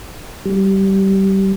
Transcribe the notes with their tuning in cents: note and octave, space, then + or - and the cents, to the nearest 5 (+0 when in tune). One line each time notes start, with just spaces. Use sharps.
G3 -20